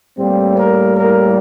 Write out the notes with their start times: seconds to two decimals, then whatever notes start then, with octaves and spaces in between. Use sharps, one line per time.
0.17 A2 G3 A#3 C4
0.56 A#4
0.95 A#4